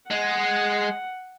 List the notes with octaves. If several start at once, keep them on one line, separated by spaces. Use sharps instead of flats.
G#3 F#5